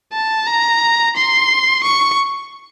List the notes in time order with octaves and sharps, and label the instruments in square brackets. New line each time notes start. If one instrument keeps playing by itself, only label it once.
[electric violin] A5
A#5
C6
C#6